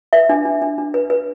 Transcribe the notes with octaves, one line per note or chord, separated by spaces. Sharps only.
B4 E5
D4
D4
D4
D4
B4
B4